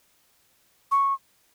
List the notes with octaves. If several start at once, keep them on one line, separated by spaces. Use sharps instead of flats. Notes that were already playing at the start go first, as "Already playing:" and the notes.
C#6